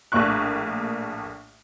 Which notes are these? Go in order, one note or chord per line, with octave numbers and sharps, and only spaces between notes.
A#1 A2 A#3 D4 C#6 F#6